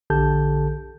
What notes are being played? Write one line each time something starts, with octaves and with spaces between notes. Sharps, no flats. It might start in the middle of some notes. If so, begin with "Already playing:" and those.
A#1 D3 G4 A4 A5 G6